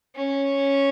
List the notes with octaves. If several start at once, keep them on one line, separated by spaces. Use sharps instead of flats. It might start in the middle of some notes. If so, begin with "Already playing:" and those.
C#4